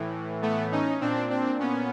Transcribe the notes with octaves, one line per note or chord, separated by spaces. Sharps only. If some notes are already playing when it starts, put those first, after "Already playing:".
Already playing: A2 E3
A3 B3
C#4 D#4
A#2 C4 D4
C4 D4
B3 C#4